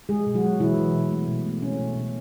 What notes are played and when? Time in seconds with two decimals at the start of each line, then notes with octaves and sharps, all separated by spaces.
0.09 G#3 G#4
0.26 B2
0.34 F#3 F#4
0.43 G#3
0.60 B2 E3 E4
0.77 B2
0.95 B2
1.11 A3
1.27 B2
1.45 A3
1.62 A3 C#4
1.79 B2
1.96 B2